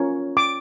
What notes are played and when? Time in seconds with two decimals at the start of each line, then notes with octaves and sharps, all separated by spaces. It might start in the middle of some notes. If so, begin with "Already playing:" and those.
Already playing: C#4 F4 A#4 C#5
0.37 D6